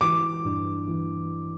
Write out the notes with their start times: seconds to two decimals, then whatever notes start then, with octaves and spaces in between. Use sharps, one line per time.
0.01 E3 D6
0.45 G2
0.88 E3